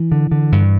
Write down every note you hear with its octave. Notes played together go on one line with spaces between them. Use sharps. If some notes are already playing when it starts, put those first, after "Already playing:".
Already playing: E3
D3
D3
G2